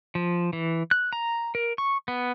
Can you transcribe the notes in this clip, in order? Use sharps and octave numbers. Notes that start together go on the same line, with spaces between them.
F3
E3
F#6
A#5
A#4
C#6
B3